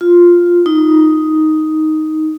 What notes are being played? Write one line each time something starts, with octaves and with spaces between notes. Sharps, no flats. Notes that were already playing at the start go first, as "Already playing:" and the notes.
F4
D#4